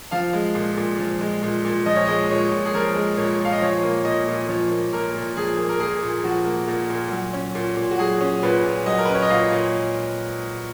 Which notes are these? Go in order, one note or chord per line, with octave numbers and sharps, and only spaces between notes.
F3 F5
G#3
A#2
A#2
F3
G#3
A#2
A#2
F3 D#5
C#5
G#3 D#5
A#2 C#5
A#2
G#4
F3 A#4
G#3
A#2 C#5
A#2 F5
D#5
F3 C#5
A#3
A#2 D#5
A#2
F3 C#5
A#3
A#2 A#4
A#2
F3 G#4
A#3
A#4
A#2 G#4
A#2
F3 F#4
A#3
A#2
A#2
F#3
C#4
A#2
A#2
F#4
F#3 G#4
C#4
A#2 B4
A#2
F#3 D#5
A#4
B4
C#4
C#5
D#5
A#2 F5
A#2